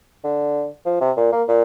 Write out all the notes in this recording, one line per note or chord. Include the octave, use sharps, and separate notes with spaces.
D3
F3
C3
A#2
A#3
A#2